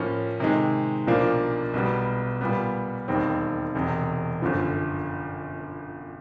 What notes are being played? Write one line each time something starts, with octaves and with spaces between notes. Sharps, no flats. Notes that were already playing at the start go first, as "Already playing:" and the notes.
Already playing: A2 F3 A#3 C#4
C3 D#3 G#3
B1 A#2 F3 A#3 D4
B1 B2 G3 B3
A#2 G3 B3
E1 D#2 D#3 G3 C4
E1 E2 C3
G1 F#2 D3 F3